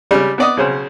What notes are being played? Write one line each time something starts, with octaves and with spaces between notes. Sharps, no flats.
C#3 G3 G#3
B3 D5 D#5
B1 C#3 C5